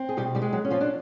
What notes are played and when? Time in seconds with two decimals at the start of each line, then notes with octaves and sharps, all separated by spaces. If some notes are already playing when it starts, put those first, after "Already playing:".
Already playing: C4
0.09 G#4
0.17 B2 G3 G4
0.35 G3 G4
0.42 G#3
0.53 F#3 F#4
0.65 C#4
0.71 F3 F4
0.81 D4